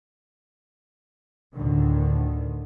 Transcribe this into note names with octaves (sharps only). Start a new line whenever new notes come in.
D2 A2 D3 D#3